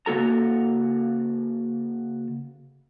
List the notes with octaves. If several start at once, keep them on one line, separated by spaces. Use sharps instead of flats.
C#3 A#3 F#4 A4 A#5